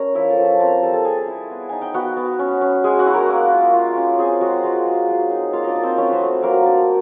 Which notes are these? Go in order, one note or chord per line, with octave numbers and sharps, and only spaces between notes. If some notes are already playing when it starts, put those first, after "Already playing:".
Already playing: C#4 A#4 A#5
F3 E4 E5
A4 A5
F3
A4 A5
C4 A#4 A#5
G3 A4 A5
A4 A5
G3 G#4 G#5
E4
B3
D#4 G#5
G5
B3 F#4 F#5
B3
C#4
C#4
G#3 G#4 G#5
F#4 F#5
E4
A#4 A#5
A#3
F4
F4
C#4
C4 G#4 G#5
G#3 F#4 F#5
G#3 F4 F5
G#3
F#3
D#4
A#3 F4 F5
D4 D5 D#5
D#4
C4 C5
F#3 C#4 C#5
B4
C4 C5
A3
F#3 A#3 A#4
D4